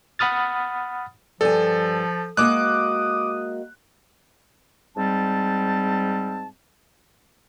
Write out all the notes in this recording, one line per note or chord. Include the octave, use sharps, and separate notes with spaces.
F#5 B5 D#6 F6 A6
G2 F3 A4 G#5
G#3 A#3 F#4 D6 D#6 F#6
G#2 G3 C4 A5